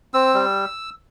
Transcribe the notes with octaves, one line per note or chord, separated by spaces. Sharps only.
C4 E6
G3